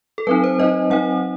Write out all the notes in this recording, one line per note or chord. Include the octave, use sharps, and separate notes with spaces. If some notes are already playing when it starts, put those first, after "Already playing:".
A4
F#3 C4 D#4 B4
C5
F#3 C4 D#4 D#5
F#3 C4 D#4 F#5